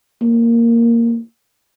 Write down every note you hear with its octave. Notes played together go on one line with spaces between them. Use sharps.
A#3